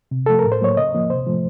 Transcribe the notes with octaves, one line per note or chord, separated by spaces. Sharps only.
C3
F3 A3 A4
A#4
A2
C5
F#3 A#3 C#5
C#3 D#5
F3 A#3
C3 C5
F3 A3